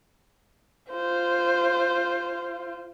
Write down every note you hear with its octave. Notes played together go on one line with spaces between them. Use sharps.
F4 C5